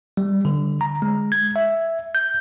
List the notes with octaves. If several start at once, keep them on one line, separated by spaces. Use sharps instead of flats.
G3
D3
A#5
G#3
G#6
E5
G6